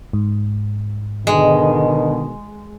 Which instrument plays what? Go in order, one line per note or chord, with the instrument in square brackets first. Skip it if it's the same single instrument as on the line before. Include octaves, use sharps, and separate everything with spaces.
[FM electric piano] G#2
[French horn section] B2 D3 D#3 [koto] G#3